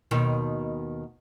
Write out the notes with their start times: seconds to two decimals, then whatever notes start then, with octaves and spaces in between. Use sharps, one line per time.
0.11 D#2 B2 D#3